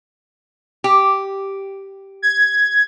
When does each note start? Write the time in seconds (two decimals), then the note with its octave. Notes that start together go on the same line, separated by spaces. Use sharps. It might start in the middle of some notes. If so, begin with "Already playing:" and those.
0.84 G4
2.22 G#6